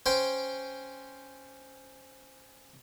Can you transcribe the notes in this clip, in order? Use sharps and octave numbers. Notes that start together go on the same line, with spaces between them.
C#4 C5 G5